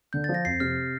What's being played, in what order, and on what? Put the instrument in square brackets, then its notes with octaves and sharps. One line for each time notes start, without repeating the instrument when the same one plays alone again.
[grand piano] D3 [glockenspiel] G6
[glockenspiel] A6
[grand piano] F3
[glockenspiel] A#6
[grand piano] F2 [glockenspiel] C7
[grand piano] C3 [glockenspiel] F6